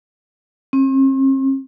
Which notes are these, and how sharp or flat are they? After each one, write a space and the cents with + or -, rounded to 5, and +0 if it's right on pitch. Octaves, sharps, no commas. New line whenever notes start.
C4 +45